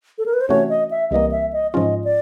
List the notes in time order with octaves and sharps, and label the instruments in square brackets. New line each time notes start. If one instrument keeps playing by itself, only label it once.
[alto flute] A4
A#4
B4
C5
[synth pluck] C3 E3 A3 C#4 F#4 [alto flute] C#5
[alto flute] D#5
E5
[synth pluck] C2 C3 E3 G3 A#3 [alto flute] D#5
[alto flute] E5
D#5
[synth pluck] G#2 F3 G#3 C#4 F4 [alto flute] D#5
[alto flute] D5